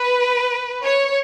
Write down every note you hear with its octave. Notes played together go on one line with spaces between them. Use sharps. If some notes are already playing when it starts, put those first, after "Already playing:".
Already playing: B4
C#5